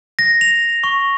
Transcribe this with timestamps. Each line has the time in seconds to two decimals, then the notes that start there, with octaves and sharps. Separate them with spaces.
0.19 A#6
0.41 F7
0.84 C#6